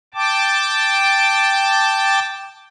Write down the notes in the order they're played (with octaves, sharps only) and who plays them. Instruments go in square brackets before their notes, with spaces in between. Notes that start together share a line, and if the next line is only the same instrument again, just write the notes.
[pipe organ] G5 A5 D6